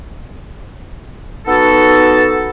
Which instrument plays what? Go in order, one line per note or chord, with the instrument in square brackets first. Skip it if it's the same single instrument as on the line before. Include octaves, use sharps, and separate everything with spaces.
[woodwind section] B3 D#4 F#4 A4